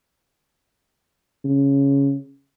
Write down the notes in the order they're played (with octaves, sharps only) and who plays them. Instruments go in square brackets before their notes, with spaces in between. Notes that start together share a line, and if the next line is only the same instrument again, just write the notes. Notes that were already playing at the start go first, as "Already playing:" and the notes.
[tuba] C#3